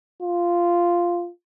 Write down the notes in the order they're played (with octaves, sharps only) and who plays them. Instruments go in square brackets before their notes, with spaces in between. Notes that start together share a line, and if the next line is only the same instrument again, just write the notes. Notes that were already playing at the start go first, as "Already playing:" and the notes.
[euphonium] F4